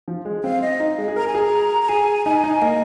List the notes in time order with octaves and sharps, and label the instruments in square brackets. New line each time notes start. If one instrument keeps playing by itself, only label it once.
[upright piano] F3
G#3
[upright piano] C4 [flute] F5
[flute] D#5
[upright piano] D#4
G#3
G#4
[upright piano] A#4 [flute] A#5
[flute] G#5
[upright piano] G#4 [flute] A#5
[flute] A#5
[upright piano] G#4 [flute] G#5
[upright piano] D#4 [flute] G#5
[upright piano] D#4
[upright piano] A#3 [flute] D#5